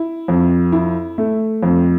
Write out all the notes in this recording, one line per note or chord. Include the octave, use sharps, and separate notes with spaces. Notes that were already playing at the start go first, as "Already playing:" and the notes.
Already playing: E4
F2
E4
A3
F2